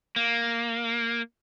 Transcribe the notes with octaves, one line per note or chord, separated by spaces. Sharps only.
A#3